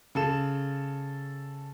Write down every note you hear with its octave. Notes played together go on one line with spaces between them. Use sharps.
C#3 A4 E7